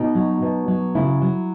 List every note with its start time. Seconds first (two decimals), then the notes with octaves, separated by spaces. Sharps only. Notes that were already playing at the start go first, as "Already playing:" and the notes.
Already playing: B2 D#4
0.15 F#3
0.42 B2
0.68 F#3
0.95 C#3 E4
1.22 F#3